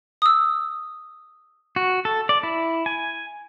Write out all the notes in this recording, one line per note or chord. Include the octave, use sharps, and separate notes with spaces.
D#6 E6
F#4
A4
D5
E4
G#5